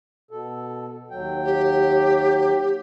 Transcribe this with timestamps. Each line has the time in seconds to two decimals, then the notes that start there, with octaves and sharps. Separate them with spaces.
0.31 B2 A4
1.11 D#2 F#3 G5
1.44 G4